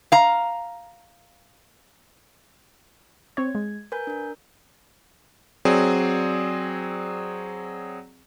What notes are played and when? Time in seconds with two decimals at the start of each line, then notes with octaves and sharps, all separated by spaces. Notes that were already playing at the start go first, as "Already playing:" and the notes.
0.12 F5 A#5
3.37 C4 C#5 G#6
3.55 G#3
3.92 A#4 B4 G#5 G6
4.07 D4 A#4
5.65 F#3 C4 G#4 D5